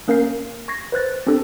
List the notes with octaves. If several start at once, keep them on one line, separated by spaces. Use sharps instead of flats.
A#3 C#4 A#4 F5 G6 C7
C#6 G#6 A#6 C7
B4 C5 F#6 A6
C4 D4 G4 A4